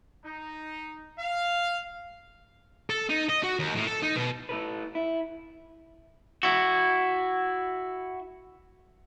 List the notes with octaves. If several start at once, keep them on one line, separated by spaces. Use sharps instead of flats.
D#4
F5
A4
D#4
D#5
F#4
D#2
A2
A4
D#4
B2
A3 E4 A4 B4
E4
E4 F#4